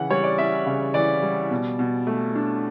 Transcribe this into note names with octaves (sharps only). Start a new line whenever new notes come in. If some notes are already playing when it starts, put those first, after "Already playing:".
Already playing: C#3 E3 C#4 F#5
G3 C#5
D5
C#4 E5
C#3
E3 D5
G3
B2
B2
A3
D4